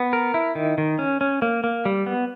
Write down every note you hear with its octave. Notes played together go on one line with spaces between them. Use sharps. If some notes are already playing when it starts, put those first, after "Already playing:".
Already playing: B3
A#4
E4
D#3
D#3
C#4
C#4
A#3
A#3
G3
B3